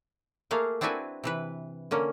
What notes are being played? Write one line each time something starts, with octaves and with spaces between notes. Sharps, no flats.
A3 A#3 G#4 F5
C4 D4 E4 F#4 B4 G#5
C3 E3 B4
D3 A#3 C#4